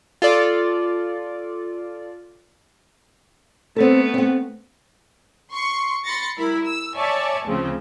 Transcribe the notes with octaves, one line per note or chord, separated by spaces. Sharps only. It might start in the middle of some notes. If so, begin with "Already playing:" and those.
F4 A4 D5
A3 B3 C4 A4
C4 F#5
C6 C#6
B5 C6 A6 A#6 C#7
G3 E4 A#4 B5
E6
C#5 D5 E5 G#5 A5
D2 C#3 F3 C4